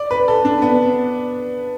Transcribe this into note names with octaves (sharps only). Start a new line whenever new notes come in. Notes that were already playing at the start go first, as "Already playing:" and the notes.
Already playing: D5
B4
A4
D4
B3